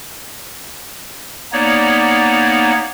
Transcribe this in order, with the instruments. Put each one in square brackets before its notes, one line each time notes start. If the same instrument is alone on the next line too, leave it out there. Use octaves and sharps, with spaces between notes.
[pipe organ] A#3 B3 D#4 C#5 D5